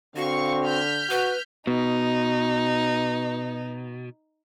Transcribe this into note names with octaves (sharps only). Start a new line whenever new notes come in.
D3 C4 F#4 F5 C#6
F6 G6 B6
F#4 B4
B2 D#4